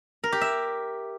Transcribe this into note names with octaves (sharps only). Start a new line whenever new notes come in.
A#4
G4
E5